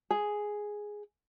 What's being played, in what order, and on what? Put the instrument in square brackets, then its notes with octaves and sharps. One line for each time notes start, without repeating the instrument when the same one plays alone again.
[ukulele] G#4